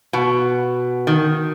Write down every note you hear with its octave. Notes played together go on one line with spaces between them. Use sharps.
B2
D#3